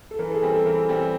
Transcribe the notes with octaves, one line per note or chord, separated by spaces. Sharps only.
A4
E3 A#4
A4
G#4
G3 C4
A4
E3 A#4
G3 C4